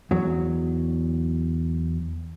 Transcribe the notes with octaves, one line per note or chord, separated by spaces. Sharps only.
E2 F#3